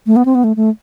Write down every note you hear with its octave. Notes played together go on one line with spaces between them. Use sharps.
A3
B3
C4
B3
A3
A3